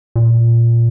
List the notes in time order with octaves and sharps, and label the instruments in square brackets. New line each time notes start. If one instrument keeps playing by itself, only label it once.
[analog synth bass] A#2